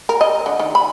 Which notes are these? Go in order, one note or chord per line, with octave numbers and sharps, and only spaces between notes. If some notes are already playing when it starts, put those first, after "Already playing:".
A#4
D#5
D3
D#3
B5